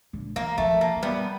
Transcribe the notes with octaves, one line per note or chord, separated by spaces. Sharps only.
D3
E3 A#3
F3 A3
A#3
F#3
G3 B3